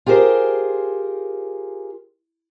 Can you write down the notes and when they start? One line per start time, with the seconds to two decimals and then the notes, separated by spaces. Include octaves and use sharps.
0.06 F4 G4 G#4 A#4 C5